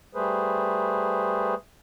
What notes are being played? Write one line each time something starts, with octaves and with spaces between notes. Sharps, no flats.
G3 A3 G#4 B4 C5